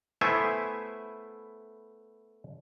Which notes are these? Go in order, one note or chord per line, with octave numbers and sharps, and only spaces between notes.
A3 B3 E4 C5 E5 G#5